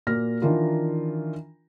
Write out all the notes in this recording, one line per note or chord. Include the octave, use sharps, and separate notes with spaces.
A#2 A#3 F#4 F6 A#6
D#3 E3 D4 F4 A#4